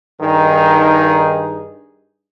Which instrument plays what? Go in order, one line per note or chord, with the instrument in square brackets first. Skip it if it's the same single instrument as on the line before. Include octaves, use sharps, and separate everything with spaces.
[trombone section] G2 D#3 D#4 G#4